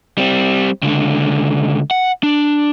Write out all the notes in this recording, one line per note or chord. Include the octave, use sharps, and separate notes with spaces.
G3 C4
C#2 D3
F#5
D4